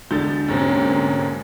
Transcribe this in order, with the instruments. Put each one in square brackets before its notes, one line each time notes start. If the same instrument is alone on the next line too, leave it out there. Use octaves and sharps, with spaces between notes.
[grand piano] E1 [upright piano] D3 [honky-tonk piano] G6 A6
[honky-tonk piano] D2 G#2 C3 [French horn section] A#3 C4 C#4